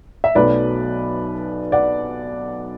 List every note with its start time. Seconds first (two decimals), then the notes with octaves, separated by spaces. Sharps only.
0.24 E5
0.35 B1 B2 F#3 A3 B4 D5
1.72 D5 F#5